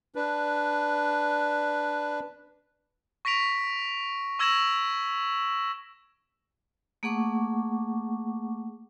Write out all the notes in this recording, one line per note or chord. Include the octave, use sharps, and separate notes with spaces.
D4 B4
C#6 A#6 B6 D7 F7
C#6 E6 G#6 A#6 E7 F#7
A3 A#3 G#4 F#5 C#6 D6